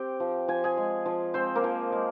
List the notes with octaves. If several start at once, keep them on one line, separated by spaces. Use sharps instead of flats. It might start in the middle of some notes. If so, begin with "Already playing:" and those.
Already playing: C4 G4 G5
F3
F3 G#5
G#4 G#5
G#3
F3
G#3 C4 C5
A#3 A#4
F3
G#3